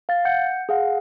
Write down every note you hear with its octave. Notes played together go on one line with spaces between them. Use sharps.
F5 A6
F#5 G6 C#7
G#4 F5 F#5